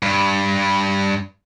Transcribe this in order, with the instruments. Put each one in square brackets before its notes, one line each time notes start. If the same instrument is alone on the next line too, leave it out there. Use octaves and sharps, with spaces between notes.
[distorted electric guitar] G2